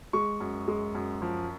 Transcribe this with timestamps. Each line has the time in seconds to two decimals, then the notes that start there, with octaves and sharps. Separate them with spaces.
0.13 G#3 C#6
0.40 F#2
0.67 G#3
0.95 F#2
1.22 F3